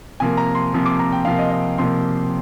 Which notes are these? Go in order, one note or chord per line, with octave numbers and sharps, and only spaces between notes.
C3 F3 A#3 G#5
A#5
C6
C3 F3 A#3
D6
A#5
G5
C3 F3 A#3 F5
D#5
D#5
C3 F3 A#3 C6